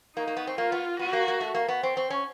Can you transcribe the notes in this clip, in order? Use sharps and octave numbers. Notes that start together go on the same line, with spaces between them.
A#3 D#4
A#3
B3
C4
A#3 F4
B3
B3 F#4
A#3
A#3
A3
A#3
B3
C4
C4
C#4